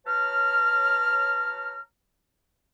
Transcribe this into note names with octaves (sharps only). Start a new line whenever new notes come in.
F#3 B4 C#5 A5 A#5 F6